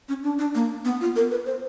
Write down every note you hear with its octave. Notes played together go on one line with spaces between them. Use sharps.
C#4
D4
D4
A#3
B3
F4
A#4
B4
C5